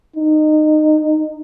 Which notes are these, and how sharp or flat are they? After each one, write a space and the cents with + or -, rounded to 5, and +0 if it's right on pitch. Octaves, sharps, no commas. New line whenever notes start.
D#4 -20